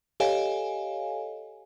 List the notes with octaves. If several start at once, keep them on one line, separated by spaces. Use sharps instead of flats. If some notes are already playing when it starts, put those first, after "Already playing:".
G4 A4 C#5 D#5 F5 G#5